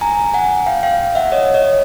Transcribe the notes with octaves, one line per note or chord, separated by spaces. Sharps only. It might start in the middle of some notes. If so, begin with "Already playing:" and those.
G#5 A#5
F#5 G#5
F5 G5
F5 G5
E5 F#5
C#5 D#5
C#5 D#5